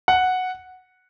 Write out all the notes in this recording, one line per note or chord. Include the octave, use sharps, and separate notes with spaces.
F#5